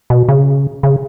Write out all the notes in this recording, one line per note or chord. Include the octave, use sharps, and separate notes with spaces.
B2
C#3
C#3